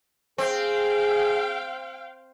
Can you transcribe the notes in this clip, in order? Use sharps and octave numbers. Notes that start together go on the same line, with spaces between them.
C4 G#4 F5 G5